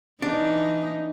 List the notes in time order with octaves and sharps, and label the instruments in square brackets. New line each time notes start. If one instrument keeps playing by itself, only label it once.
[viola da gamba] E3 D#4 [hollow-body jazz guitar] D4